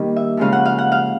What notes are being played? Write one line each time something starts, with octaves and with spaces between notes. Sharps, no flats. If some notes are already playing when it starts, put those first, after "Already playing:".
Already playing: D#3 G3 A#3 D4
E5
C#3 F3 G#3 F5
F#5
F5
F#5
F5